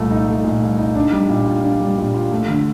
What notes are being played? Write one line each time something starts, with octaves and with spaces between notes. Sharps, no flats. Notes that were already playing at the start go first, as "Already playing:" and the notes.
Already playing: C2 A#2 A3
D#4
A3
A#2
C2
D#4
D4
G3
A#2
F4
D4
G3
A#2
F4
A3
D3